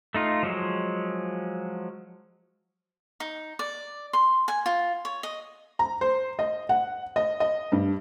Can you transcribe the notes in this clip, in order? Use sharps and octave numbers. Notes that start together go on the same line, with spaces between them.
A3 D#4 F4
F3 F#3 G#3
D#4
D5
C6
G#5
F4
C#5
D#5
A#5
C5
D#5
F#5
D#5
D#5
G2